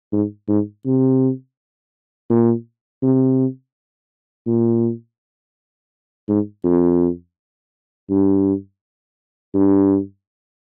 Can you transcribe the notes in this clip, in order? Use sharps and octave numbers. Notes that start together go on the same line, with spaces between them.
G#2
G#2
C3
A#2
C3
A#2
G#2
F2
G2
G2